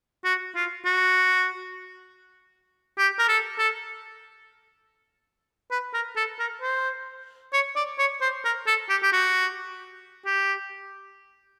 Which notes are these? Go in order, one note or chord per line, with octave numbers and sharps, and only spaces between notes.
F#4
F4
F#4
G4
A#4
A4
A4
B4
A#4
A4
A#4
C5
C#5
D5
C#5
C5
A#4
A4
G4
G4
F#4
G4